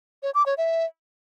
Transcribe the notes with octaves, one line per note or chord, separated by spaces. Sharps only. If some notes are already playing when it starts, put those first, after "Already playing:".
C#5
D6
C#5
E5